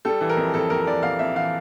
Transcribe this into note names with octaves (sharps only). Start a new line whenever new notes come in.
G3 A4
E3
A#4
F2
F2 A4
F2 A#4
E3 D5
F2 F5
F2 E5
E3 F5